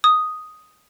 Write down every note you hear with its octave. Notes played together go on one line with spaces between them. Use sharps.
D#6